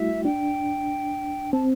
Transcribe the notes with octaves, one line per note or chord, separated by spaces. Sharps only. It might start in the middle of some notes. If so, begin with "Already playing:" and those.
Already playing: G3 A3 E4 F#4 E5
D4 G5
C4 A5